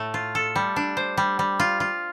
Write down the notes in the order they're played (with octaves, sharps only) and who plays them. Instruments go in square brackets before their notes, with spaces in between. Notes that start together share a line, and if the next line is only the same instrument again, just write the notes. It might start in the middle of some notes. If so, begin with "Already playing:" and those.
Already playing: [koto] A2 A3
F4
A4
G3
D4
C5
G3
G3
F4
F4